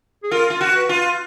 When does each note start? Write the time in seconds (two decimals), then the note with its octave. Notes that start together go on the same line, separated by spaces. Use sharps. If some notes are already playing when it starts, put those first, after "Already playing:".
0.23 G#4
0.31 F4 A#4
0.50 F4
0.61 F#4
0.75 B4
0.89 F4